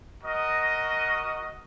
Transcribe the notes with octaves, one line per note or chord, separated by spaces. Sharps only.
F#4 A#4 D#5